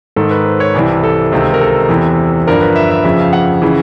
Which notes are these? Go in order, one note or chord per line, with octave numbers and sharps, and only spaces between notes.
G#2 D#3 A4
B4
C5
C#5
C2 C3 E3 D5
A4
C#2 C3 D#3
A#4
A4
E2 C3 E3
G2 D3 F3 A#4
B4
E5
E5
F2 C#3 F3 E5
F5
F#5
C#3 E3